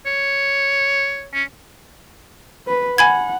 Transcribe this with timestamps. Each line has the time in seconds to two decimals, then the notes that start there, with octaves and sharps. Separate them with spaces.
0.06 C#5
1.34 C#4
2.67 B4
2.98 F#5 G#5 B5 G#6